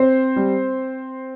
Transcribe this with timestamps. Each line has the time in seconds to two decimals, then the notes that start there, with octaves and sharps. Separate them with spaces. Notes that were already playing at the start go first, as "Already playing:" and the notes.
Already playing: C4 C5
0.36 G3